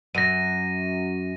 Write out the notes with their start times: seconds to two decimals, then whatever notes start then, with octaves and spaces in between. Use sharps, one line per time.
0.15 F#2 A#6 D#7